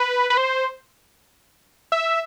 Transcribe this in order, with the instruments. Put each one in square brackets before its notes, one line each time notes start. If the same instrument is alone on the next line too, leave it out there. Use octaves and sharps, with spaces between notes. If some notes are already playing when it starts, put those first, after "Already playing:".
Already playing: [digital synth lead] B4
B4
C5
E5